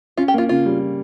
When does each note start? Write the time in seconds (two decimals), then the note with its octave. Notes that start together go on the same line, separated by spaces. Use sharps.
0.17 C#4 F4
0.28 G4
0.34 A#3 F4
0.49 C#3 F4
0.66 G3